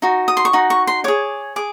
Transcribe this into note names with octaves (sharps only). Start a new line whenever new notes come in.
D#4 F#4
D#6
C6
C#6
D#4 F#4
C#6
C6
G#4 C#5 D6
G#4 D6